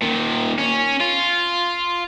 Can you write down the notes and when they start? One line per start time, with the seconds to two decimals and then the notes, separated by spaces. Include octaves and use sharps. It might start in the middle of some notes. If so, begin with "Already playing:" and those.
0.02 A#2 D#3
0.59 C#4
1.01 F4